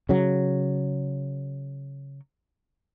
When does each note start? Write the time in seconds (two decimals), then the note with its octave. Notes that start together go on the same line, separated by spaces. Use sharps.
0.09 C#3 F#3